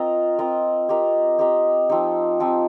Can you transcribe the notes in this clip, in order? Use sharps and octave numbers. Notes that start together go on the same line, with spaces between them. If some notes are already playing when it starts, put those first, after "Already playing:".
Already playing: C4 F4 A#4 D#5
C4 F4 A#4 D#5
C4 G4 A#4 D#5
C4 G4 A#4 D#5
F3 C4 D#4 G4
F3 C4 D#4 G4